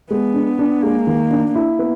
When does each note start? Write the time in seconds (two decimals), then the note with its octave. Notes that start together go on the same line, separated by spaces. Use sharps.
0.10 G#3 B3
0.34 D4
0.59 D4
0.83 G#3 A#3
1.07 D#3
1.31 D4
1.55 A#3 E4
1.79 B3